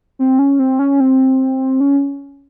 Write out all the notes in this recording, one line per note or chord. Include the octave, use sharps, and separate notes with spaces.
C4
C#4
C4
C#4
C4
C#4